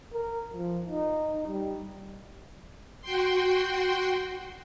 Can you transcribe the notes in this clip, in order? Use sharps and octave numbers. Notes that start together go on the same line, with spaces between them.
A#4
F3
D#4
G3
F#4 G5 C6